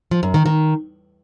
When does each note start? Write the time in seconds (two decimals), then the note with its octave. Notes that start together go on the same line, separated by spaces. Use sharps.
0.11 F3
0.23 F#2
0.34 D#3
0.46 D#3